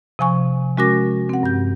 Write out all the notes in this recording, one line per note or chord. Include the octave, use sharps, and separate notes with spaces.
C3 F3 G#5 C#6
G#3 C#4 F#4 A#4 D6 A#6
C4 F#5
G2 G6